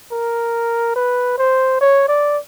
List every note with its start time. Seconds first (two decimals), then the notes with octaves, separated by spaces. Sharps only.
0.11 A#4
0.96 B4
1.38 C5
1.81 C#5
2.08 D5